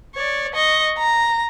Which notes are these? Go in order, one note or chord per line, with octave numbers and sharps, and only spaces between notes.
C#5 D5
D#5 C#6
A#5